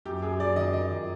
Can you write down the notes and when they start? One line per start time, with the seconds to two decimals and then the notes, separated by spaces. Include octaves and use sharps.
0.05 F#2 G4
0.22 F#2 G#4
0.39 F#2 D5
0.56 D#3 D#5
0.73 D#3 D#5
0.90 F#2